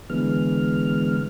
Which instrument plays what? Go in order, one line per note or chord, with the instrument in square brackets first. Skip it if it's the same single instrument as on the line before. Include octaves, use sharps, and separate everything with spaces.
[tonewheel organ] D3 E3 G#3 B3 F6